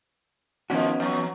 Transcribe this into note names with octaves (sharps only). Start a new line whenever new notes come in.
G#2 D#3 F3 B3 C#4 F#4
E2 F#3